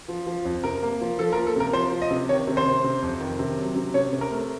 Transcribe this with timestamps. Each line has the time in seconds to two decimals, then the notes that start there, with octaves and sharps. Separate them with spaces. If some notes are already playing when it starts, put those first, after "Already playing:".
0.08 F3
0.27 F3
0.45 F2
0.64 C3 A#4
0.83 A#3
1.01 F3
1.19 F3 A4
1.33 A#4
1.37 A#3
1.47 A4
1.56 C3 A#4
1.73 F3 C5
1.92 F3
2.02 D#5
2.11 C3
2.29 D#3 C#5
2.47 C3
2.57 C5
2.66 C3
2.84 C3
3.02 F2
3.21 D#3
3.39 C3
3.57 F#3
3.76 C3
3.94 C3 C#5
4.13 C3
4.21 A#4
4.31 A3